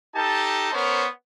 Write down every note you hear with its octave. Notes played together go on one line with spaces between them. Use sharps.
D#4 G4 A4 A5
B3 C#4 A#4 C5 C#5